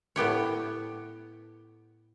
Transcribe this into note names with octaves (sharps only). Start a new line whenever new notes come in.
A2 B3 G4 C#5